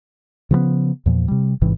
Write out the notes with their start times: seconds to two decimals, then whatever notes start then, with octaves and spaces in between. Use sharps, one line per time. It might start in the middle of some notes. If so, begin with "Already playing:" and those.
0.51 C#3 F3 G3 B3
1.06 E2 A#2 F3
1.28 C3 G3
1.61 A1 G#2 C3 E3